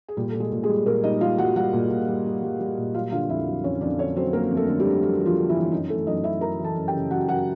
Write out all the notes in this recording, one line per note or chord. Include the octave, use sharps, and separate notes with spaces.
G#4
A#2 G3 G4
A#2 A4
G#3 G#4
A#2
G#3 G#4
G3
A#2 A#3 A#4
G3 D#4 D#5
G3 F4 F5
G3 F#4 F#5
G3 F#4 F#5
A#2
A#2
G3
G3
G3
G3
A#2
F#3 F4 F5
D3 F4 F5
F2 E4 E5
F#3
F2 C#4 C#5
F2 D4 D5
D3 C#4 C#5
F#3 C4 C5
F#3 A#3 A#4
F2
A3 A4
D3
G3 G4
D3
F#3 F#4
F#3
F3 F4
D3
E3 E4
F#3
F#2 D#4
E3 A3 A4
F#2 D#4 D#5
F#2 E4 E5
F#2 A#4 A#5
E3
A4 A5
F#2
G4 G5
C#3
F#2 F#4 F#5
F#2 F#4 F#5